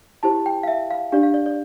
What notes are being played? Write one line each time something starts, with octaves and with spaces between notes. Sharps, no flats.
E4 G4 C5 A5
G5
F5
E5
F5
D4 G4 D5 F5
F5
D5
D5